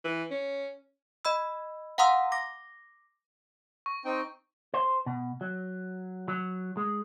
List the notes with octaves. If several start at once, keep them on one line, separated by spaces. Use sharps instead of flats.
E3
C#4
D#5 B5 E6
F5 F#5 A#5 C6 D#6 E6
D6 A#6
C#6
C4 D#4 G5
C5
B2
F#3
F#3
G#3